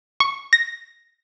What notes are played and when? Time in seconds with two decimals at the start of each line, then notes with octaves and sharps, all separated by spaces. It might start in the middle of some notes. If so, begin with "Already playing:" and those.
0.20 C#6
0.53 A#6